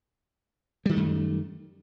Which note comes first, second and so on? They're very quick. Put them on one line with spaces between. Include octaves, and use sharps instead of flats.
G3 D#3 A3 F#2